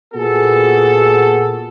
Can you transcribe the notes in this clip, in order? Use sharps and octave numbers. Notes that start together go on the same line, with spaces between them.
A#2 B3 F#4 G#4 A4